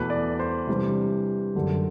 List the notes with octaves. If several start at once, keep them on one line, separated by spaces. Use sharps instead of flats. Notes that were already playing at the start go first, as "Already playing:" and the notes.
Already playing: E2 B2 A3 B4
D5
C5
C3 E3 G3 D4
F#2 D3 A3